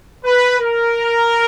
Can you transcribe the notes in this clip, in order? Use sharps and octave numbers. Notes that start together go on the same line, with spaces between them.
B4
A#4